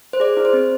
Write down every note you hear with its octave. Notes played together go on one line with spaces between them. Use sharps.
C5
G#4 D5
E4
C5
C4